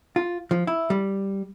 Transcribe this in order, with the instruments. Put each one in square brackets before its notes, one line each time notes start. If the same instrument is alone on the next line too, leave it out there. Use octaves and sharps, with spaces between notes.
[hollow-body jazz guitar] F4
F3
E4
G3